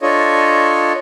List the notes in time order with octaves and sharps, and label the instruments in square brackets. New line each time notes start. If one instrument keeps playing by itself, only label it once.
[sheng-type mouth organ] D4 F4 A4 C#5 D#5